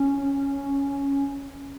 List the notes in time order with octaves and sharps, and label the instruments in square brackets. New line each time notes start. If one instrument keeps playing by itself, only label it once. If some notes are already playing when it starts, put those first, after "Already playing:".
Already playing: [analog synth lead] C#4